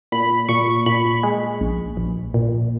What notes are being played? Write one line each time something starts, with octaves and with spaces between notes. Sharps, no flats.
A#2 B5
A#2 C#6
A#2 B5
G#3
A#1
A#1
A#2